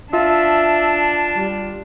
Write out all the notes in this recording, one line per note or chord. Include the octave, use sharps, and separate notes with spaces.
D4 F4 E5 A5
G3